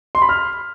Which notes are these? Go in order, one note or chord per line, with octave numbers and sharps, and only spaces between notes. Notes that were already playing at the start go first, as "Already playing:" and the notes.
C6
B5
F6